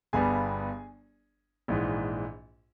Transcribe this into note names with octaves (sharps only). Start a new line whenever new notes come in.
G1 G2 G3 B3 G#4 G#5
A#1 G#2 E3